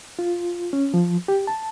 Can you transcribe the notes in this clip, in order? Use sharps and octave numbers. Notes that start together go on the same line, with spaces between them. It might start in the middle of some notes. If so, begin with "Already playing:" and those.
F4
C#4
F3
G4
A5